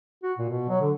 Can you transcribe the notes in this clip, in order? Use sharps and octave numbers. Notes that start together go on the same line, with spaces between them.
F#4
A#2
B2
F#3
D3